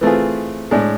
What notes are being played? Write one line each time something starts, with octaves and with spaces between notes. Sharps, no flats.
E3 A3 C4 F4 G#4
A2 G#3 D4